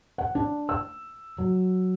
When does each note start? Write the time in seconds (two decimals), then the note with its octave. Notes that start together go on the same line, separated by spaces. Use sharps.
0.18 F#5
0.35 D4
0.69 E6
1.38 F#3